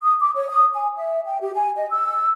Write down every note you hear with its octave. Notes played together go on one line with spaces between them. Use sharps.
D#6
D6
C#5
D#6
G#5
E5
G5
G4
G#5
D#5
E6